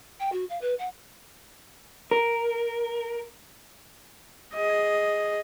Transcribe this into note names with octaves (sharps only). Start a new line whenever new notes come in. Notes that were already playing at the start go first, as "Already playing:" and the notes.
G5
F#4
F5
B4
F#5
A#4
G#4 D#5